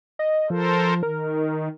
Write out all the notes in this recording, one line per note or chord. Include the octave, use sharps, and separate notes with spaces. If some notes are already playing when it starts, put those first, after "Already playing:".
D#5
F3 A4 A#4 C5
D#3 A#4